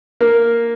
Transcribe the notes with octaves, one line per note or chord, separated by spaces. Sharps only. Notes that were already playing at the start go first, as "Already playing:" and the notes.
A#3